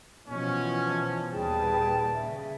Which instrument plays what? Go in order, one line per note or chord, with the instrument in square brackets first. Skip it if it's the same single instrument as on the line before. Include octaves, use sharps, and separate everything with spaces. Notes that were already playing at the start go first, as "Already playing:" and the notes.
[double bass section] B2 E3 F3 [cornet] C#4
[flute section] A5
[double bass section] D#2 A#2 G3 [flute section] G#4 B4 G5 [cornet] A5
[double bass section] C#3 [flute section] E5